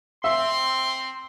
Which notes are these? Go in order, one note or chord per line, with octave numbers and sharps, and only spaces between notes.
C4 E5 C6